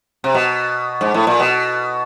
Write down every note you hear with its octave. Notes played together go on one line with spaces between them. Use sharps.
C3
B2
G#2
A2
A#2
B2